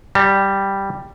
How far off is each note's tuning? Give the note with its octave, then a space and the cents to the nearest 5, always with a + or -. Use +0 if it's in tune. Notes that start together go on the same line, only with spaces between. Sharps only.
G3 +0 A#5 -45